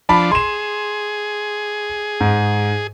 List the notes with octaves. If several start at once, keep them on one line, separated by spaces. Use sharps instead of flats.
F3 D4 A5 B5
G#4 C6 E7
G#2